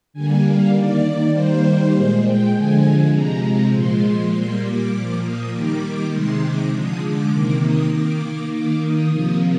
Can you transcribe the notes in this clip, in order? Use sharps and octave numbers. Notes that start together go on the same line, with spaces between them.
D3 G3 A#3 G#5
F5
D#3 A#3 D5
D#3 G3 A#3 C5
A#2 G#3
G5
D3 F3 G#3 G#5
C3 F3 G#3 A#5
A#2 F3 G#3 C6
C6
A#2 G3 A#3 C6
D6
A#2 F3 A#3
D#6
D#3 G3 A#3 D6
C3 D#3 G#3 C6
D6
D3 F3 G#3 D#6
D6
C3 D#3 A#3
D#6
D#3 A#3 D6
D#3 A#3 D6
D#6
C3 F3 A#3